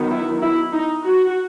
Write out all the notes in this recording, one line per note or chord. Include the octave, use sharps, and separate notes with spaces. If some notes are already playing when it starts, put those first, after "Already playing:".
Already playing: D#3 F#3 B3 D#4
E4
E4
D#4
F#4